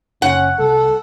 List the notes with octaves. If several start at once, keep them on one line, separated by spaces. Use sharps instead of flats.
F#1 C#4 F#5
C2 A4